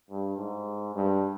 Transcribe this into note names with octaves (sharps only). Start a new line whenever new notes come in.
G2
G#2
G2